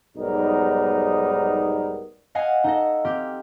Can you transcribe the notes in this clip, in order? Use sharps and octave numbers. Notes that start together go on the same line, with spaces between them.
B1 G#2 G3 B3 D#4 A#4
D#5 F5 F#5 G#5
D#4 A4 D#5
C4 G4 F6